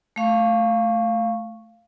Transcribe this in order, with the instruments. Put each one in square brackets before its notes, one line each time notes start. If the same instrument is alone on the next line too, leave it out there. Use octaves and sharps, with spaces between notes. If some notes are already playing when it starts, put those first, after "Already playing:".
[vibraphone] A3 F5 C#6